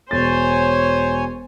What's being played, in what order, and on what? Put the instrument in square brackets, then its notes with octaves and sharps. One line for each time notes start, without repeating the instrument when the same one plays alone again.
[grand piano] E1 A6 [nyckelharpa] C5 [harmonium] C#5 G#5